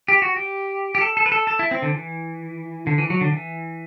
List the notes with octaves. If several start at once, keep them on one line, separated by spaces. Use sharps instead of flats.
G4
F#4
G4
G4
A4
A4
B4
A4
A4
E4
C4
D3
E3
D3
E3
F#3
D3
E3